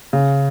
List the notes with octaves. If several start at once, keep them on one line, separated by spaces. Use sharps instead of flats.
C#3